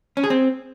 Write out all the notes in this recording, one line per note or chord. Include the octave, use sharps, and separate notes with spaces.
C#4
G#4
C4